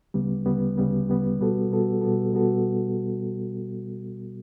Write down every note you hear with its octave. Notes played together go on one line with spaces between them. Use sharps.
D2 C#3 G3 B3
D2 C#3 G3 B3
D2 C#3 G3 B3
D2 C#3 G3 B3
B2 G3 B3 F#4 A4
B2 G3 B3 F#4 A4
B2 G3 B3 F#4 A4
B2 G3 B3 F#4 A4